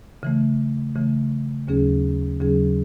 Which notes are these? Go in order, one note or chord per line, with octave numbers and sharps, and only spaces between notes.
C#3 E3 A3
C#3 E3 A3
D#2 C#3 F#3 C#4 G#4
D#2 C#3 F#3 C#4 G#4